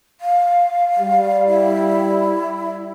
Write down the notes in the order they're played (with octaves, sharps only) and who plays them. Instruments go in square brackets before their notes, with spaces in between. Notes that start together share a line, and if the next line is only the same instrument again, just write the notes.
[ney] F5
[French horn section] G3
[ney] E4